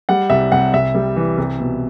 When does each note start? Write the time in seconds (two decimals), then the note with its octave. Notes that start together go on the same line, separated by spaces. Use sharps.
0.09 G3 F#5
0.30 C2 E5
0.52 C2 F#5
0.73 C2 E5
0.95 G3
1.16 E3
1.38 C2
1.60 B2